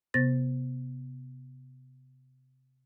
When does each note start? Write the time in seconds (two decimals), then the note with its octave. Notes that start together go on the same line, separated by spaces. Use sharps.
0.14 C3 B3 C5 A6 A#6